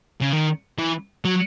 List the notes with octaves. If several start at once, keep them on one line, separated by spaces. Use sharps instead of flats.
C#3
D#3
E3
F#3